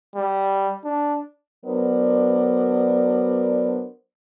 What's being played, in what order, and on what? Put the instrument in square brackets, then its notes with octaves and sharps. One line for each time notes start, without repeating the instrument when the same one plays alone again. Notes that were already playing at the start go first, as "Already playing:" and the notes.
[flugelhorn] G3
D4
[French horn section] F#3 B3 D4 A#4 C5 D5